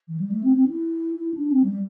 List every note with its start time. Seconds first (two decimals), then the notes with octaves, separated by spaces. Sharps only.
0.08 E3
0.20 G3
0.32 A3
0.44 C4
0.56 C4
0.68 E4
1.16 E4
1.34 D4
1.52 C4
1.64 G3